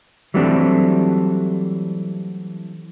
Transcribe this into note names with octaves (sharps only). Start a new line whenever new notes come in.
E3 F#3 G3 A3 C4 D4